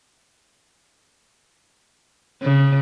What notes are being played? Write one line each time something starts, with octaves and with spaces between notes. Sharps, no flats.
C#3